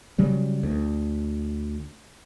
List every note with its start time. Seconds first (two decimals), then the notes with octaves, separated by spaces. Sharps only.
0.18 C#3 F#3 G3
0.63 D2